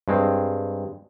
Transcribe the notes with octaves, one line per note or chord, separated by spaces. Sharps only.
G2 G#3 C4